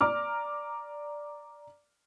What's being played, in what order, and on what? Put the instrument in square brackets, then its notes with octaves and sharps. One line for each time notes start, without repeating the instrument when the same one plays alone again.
[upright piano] D5 A#5 D6 F6